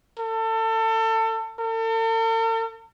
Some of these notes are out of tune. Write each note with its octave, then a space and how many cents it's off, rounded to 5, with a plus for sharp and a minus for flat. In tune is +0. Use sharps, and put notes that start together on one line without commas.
A4 +30
A4 +45